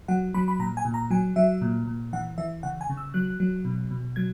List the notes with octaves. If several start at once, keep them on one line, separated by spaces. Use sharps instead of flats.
F#3 F#5
F#3 B5
B5
A#2 A#5
G#5
A#2
A#5
F#3 G#5
F#3 E5
A#2
A#2
E3 F#5
E3 E5
C#3 F#5
G#5
C#3
E6
F#3 F#6
F#3
B2
B2
F#3 G#6